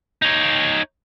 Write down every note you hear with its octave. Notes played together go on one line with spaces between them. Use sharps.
D#4 C#5